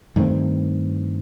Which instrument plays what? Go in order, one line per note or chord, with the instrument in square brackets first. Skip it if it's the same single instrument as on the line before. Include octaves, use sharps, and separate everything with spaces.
[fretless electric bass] G2 D#3 A3 C4